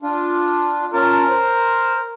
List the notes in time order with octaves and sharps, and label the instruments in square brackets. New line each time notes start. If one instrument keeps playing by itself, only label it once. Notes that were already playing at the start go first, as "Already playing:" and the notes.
[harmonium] D4 F4
[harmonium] C#4 F4 A5 [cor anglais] A#4
[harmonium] C5